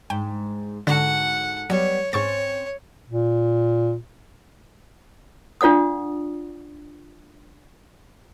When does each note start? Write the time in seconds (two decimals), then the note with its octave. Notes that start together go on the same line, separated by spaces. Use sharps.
0.10 G#2 G5
0.87 G#2 D3 F#4 A4 F#5
1.70 F#3 G3 B3 C#5
2.13 G#2 C4 C#4 C#5 C#6 A6
3.10 A#2
5.61 D4 F4 D5 F#5 D#6